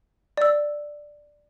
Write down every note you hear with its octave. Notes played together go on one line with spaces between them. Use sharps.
D5 E6